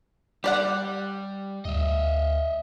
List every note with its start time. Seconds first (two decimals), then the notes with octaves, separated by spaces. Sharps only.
0.44 G3 G4 D5 F#5
1.65 D2 D#5 E5